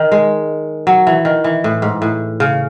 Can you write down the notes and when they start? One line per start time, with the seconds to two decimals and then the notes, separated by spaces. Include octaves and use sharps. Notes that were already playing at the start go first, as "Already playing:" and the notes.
Already playing: D#3
0.12 G#3
0.87 F#3
1.07 E3
1.25 D#3
1.44 E3
1.64 A2
1.82 G#2
2.02 A2
2.40 C#3